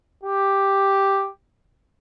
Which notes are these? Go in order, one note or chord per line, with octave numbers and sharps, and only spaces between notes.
G4